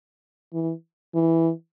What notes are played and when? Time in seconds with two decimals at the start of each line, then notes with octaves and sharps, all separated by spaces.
0.54 E3
1.14 E3